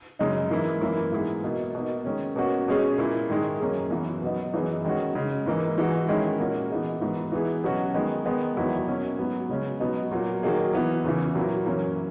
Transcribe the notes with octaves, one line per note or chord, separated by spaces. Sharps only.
F#2 C#3 G#3 D#4
G#2 E3 A#3 E4
F#2 E3 A#3 E4
G#2 E3 B3 E4 G#4
B2 A#3 D#4
B2 A#3 D#4
D#3 G#3 C#4
B2 A#3 C#4 F#4
B2 G#3 C#4 G#4
A#2 A#3 E4
G#2 D#3 G#3
F#2 D#3 A#3 C#4 G#4
F#2 E3 B3 F#4
B2 F#3 B3 D#4
F#2 E3 B3 D#4 G#4
D#3 G#3 C#4 F#4
C#3 G#3 D#4
G#2 E3 A#3 D#4
E3 G#3 D#4 F#4
D#3 G#3 C#4 E4
A#2 A#3 C#4 F#4
E3 B3 D#4 G#4
G#2 E3 B3 F#4
E3 B3 E4 G#4
B2 F#3 C#4 F#4
D#3 G#3 B3
D#3 G#3 B3 D#4
E2 D#3 F#3 B3 E4
B2 A#3 C#4
G#2 F#3 B3
C#3 G#3 C#4
B2 F#3 B3 D#4
A#2 F#3 A#3
D#3 F#3 A#3 D#4 G#4
E3 B3 E4
E2 C#3 E3
A#2 F#3 A#3 E4
F#2 E3 A#3 C#4